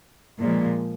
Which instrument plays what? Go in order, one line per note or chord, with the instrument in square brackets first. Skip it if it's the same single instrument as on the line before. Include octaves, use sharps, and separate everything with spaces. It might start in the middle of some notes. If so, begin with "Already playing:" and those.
[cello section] A#2 F3 G#3